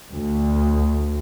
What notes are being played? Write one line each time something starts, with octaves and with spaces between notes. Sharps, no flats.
D2